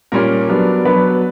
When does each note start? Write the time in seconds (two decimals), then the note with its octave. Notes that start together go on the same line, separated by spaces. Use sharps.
0.12 A#2 G3 C#4 A#4
0.48 F#3 B3 D4
0.85 F#3 B3 D4 B4